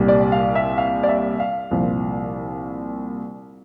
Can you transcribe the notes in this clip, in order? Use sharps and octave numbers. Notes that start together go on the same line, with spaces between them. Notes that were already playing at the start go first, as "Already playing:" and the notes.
Already playing: C2 A#2 G3
D5
F5
E5
F5
D5
E5
F5
C2 A#2 F3